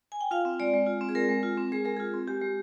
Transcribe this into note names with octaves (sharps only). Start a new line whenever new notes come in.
G#5
G5
F4 F5
C4
G#3 D5
G#3
F4
C4
G#4
G#3 A#4
G#3
F4
C4
G#3 G#4
G#3 A#4
F4 G#4
C4
G#3 G4
G#3